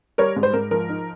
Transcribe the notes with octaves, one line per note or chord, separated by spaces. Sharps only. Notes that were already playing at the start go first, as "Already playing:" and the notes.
G3 A#4 C#5
G#2
C5
G#2 A#4
F3 A#4
D#4